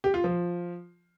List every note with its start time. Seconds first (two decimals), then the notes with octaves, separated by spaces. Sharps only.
0.04 G4
0.14 F4
0.24 F3